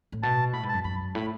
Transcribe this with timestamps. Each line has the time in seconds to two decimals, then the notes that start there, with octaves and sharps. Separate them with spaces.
0.12 A2
0.23 B2 A5
0.53 A2 B5
0.63 G#2
0.69 F#2 A5
0.84 F#2 B5
1.15 A2 B5